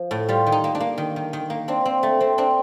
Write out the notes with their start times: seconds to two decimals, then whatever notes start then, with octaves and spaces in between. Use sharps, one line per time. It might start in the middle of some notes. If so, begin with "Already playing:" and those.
Already playing: F3
0.11 A2
0.29 G3 F4
0.46 D#3
0.52 D#4
0.64 A#3
0.75 D4
0.80 A#3
0.98 D#3
1.16 D#3
1.33 D#3
1.50 A#3
1.68 C4 D4
1.85 C4
2.03 A3
2.20 C4
2.38 C4 D4